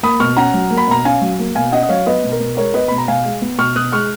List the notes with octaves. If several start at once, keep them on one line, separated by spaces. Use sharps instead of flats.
A#3 B5 D#6
B2 C#6 F6
C#4 F#5 A#5
F#3
A#3
B5
B2 A#5
C#4 F5 G#5
F#3
A#3
B2 F5 G#5
C#4 D#5 F#5
D#5
F#3 C#5 F5
B3 B4 D#5
B2
A#4
B2
G#3 A#4 C#5
B3 B4 D#5
B2 B5
A#5
B2 F5 G#5
G#3
B3
B2 C#6 F6
B2 D#6 F#6
G#3 C#6 F6